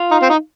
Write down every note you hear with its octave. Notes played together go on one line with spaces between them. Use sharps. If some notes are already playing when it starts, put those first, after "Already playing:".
Already playing: F4 F5
D#4
C4
D#4